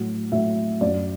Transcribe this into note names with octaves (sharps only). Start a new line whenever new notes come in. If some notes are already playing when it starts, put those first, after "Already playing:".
Already playing: A2 F#3
A2 F#3 E5
F#2 D5
F#3